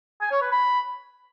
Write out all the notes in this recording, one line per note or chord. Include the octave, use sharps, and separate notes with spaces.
G#5
C#5
B4
B5